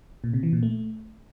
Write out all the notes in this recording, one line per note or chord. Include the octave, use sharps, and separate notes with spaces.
A#2
C3
E3
A#2
A3